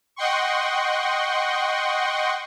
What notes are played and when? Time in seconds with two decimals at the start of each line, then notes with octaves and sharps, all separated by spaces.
0.16 D#5 F#5 G5 C6 C#6